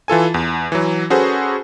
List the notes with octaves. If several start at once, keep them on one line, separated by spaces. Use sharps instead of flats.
E3 F4 A4 G#5
E2
E3 F#3
C#4 F#4 G#4 A4 B4 C5